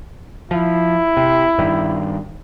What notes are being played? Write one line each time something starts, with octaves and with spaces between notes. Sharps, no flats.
F3 E4
C3
G2 D#3